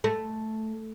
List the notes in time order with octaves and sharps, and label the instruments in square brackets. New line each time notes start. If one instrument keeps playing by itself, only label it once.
[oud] A3